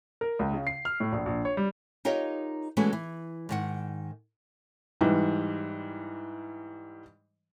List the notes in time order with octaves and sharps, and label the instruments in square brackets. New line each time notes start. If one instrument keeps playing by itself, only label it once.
[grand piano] A#4
C#2
C#3
C7
F6
A2
A#1
A#1
C#5
G3
[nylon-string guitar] D#4 F4 G4 A#4 C#5 D#5
E3 G#3 A3 B3 C#4 F#4
E3
G#2 D#3 F#5
[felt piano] G#2 E3 G3